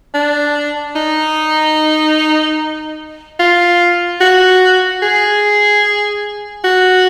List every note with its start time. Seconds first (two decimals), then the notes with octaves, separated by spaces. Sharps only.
0.15 D4
0.96 D#4
3.40 F4
4.21 F#4
5.02 G#4
6.64 F#4